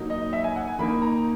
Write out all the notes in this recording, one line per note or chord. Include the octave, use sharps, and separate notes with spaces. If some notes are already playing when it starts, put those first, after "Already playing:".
Already playing: F#3 A#3 D#4
D#5
E5
G#5
F#5
G#5
D#3 A#3 D#4 B5
A#5